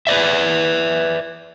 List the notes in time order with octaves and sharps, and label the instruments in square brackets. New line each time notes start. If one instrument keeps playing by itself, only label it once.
[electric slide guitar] B4 C5 D5 E5